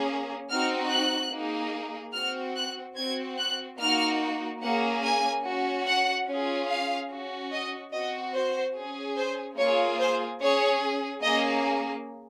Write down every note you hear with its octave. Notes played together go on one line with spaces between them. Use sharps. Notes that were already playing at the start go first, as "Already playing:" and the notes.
Already playing: A#3 C#4 G#4
C4 D#4 F#4 F6
F#6
A#3 D#4 G#4
C4 F#4 F6
F#6
C4 F#4 G#6
F#6
A#3 D#4 F#4 F6
A#3 C#4 G#4 F#5
G#5
C#4 F#4
F#5
C#4 F4 G#4
F5
C#4 F#4
D#5
C4 F#4 D#5
C5
C#4 G#4
C5
A#3 F4 G#4 C#5
C5
C#4 G#4 C#5
A#3 C#4 G#4 D#5